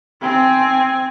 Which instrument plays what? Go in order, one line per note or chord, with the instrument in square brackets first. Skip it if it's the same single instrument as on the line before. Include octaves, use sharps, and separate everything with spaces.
[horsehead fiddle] C4 G#5